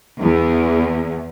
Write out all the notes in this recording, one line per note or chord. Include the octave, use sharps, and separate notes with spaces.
E2